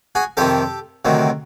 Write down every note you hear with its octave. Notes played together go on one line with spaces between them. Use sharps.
F#4 G#4
F2 C3 D#3 G4 A4
D2 C3 D#3 F#3